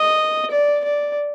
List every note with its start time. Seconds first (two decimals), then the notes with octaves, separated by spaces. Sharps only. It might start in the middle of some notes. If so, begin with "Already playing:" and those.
Already playing: D#5
0.51 D5
0.84 D5